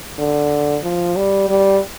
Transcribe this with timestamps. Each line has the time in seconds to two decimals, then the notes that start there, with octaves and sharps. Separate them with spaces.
0.19 D3
0.84 F3
1.16 G3
1.49 G3